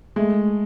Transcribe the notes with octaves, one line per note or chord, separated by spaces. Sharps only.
G#3 A3